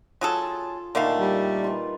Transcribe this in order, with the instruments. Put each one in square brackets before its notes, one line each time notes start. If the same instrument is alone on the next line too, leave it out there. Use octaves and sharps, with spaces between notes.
[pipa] F#3 G#4 A4 [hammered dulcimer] F4
[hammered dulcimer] A#2 D#3 [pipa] D3 A3 F5
[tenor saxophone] G3
[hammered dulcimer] F4 B4